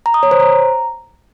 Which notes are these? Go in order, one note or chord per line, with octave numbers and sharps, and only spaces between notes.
A#5
D#6
C#5
C5
A#5